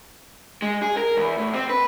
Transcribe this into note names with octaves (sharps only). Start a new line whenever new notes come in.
G#3
G#4
A#4
E2
A2
C4
B4